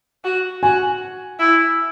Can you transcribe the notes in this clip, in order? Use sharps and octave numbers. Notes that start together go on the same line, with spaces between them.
F#4
F#4 G#5
E4